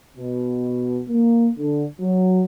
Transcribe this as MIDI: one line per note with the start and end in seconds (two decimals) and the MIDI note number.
0.17 1.01 47
1.09 1.50 58
1.58 1.84 50
2.00 2.43 54